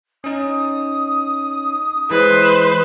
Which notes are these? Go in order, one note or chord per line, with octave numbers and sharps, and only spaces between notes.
C#4 D#4 D#6
E3 G#3 B4 C5